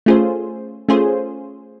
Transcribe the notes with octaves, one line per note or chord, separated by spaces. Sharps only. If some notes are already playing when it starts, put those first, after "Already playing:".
A3 C#4 F4 G#4 C5
A3 C#4 F4 G#4 C5